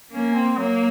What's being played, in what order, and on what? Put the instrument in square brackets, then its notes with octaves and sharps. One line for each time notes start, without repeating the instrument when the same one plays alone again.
[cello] A#3 [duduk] C#4
[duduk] C4
[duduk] F#3 [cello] A#3